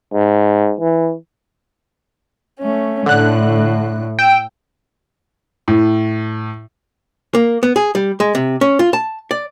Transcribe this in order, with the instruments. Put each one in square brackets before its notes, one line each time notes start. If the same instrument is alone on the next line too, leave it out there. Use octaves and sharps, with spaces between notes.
[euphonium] G#2
E3
[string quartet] A3 C#4
[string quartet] A2 [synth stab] D3 F#6
[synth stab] G5 E6
[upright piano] A2
[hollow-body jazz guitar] A#3
B3
G#4
G3
G#3
C3
C#4
F4
A5
D5